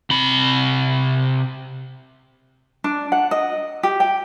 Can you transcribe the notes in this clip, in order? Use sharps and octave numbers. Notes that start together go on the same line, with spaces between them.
C3 B5
D4
F#5
D#5
G4
G5